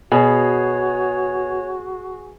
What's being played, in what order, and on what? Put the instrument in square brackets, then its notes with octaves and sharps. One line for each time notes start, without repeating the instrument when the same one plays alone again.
[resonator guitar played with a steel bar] B2 [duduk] F#4 [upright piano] G#4 [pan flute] C#5